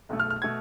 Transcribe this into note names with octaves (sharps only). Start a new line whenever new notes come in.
B1 B2 A3
F6
F6
B2 A3 G#6